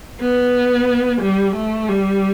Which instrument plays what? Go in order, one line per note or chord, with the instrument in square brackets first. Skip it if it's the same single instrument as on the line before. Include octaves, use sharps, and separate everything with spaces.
[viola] B3
G3
A3
G3